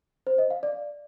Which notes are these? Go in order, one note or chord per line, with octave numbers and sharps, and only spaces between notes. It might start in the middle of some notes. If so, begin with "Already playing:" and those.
C5
D#5
F5
D5